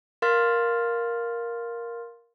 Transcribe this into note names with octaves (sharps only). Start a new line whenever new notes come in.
A#4 F5 C6 F6 A6